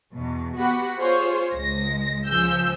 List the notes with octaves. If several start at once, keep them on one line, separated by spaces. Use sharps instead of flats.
E2 B2
B3 F#4 G4 F#5 B5
F4 G#4 C5 C#5
C#2 G#3 A#6
C#2 F3 G#4 E6 G6